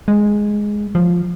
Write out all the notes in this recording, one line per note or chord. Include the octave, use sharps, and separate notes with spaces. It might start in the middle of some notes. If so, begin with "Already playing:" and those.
G#3
F3